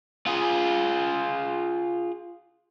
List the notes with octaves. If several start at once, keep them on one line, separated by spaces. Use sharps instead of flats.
F4 G#4